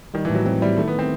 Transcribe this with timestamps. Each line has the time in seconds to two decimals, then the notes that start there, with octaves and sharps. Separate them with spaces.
0.14 D#3 G3
0.25 E3
0.30 A2 F#3
0.46 F#3 C4
0.62 G3 E4
0.77 D#3 A3
0.88 B3
0.99 C4